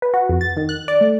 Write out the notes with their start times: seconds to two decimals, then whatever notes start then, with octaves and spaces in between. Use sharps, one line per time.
0.02 B4
0.14 F#4
0.29 F2
0.41 A6
0.57 D#3
0.69 F#6
0.88 D5
1.01 A3